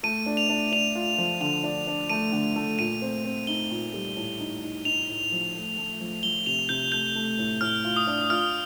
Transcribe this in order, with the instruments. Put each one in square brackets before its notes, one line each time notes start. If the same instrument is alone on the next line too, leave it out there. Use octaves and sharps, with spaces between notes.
[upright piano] A3 [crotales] D#7
[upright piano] D4
[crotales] F7
[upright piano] D4
[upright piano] D4 [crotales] F7
[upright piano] F4
F3
[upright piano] D3 [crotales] F7
[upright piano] D4
D4
[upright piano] A3 [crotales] D#7
[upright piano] D3
A3
[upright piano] A#2 [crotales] D#7
[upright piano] C4
C4
[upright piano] D#4 [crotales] G7
[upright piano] A#2
G3
A2
D#4
D#4
[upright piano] D#4 [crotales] F7
[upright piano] A2
F3
A3
A3
F3
[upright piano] F3 [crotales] G7
[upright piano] C3 [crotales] F7
[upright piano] C3 [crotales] G6
[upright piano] A3 [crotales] G6
[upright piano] A3
A2
[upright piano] A2 [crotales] F6
[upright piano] F4
[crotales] D#6
[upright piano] D4
[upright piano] F4 [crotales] F6